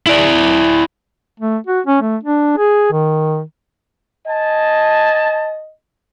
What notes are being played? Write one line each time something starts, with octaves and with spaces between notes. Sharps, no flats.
E4 D5
A3
F#4
C#4
A3
D4
G#4
D#3
D#5 G#5 A5